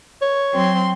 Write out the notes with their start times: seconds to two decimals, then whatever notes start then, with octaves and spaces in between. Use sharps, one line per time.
0.22 C#5
0.52 F#3 C4 C6